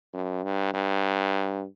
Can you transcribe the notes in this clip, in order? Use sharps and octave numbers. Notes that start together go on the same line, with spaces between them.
F#2
G2
G2